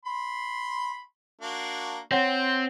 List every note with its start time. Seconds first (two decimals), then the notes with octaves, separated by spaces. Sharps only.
0.05 B5 C6
1.41 A#3 D4 F#4
2.12 C4 C#5 F#5 C6